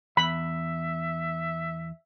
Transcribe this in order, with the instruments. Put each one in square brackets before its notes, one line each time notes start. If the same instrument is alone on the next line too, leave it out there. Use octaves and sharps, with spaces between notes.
[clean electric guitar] E2 [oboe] E5 [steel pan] B5